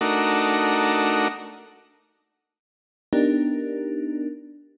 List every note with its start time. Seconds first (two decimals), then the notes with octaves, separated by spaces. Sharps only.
0.01 A3 D4 D#4 F#4 A#4
3.13 B3 D4 D#4 G4 A#4